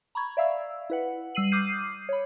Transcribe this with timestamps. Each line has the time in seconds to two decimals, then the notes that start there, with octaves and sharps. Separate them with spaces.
0.15 A#5 B5 C#6 G#6
0.37 D5 E5 F5 E6
0.90 E4 B4 F#5
1.35 G3 E6 C7 D#7 F#7
1.52 D6 D#6 F6 G6 C7 D#7
2.09 C#5 B5